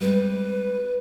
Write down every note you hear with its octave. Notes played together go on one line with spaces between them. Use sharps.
G3 G#3 C4 B4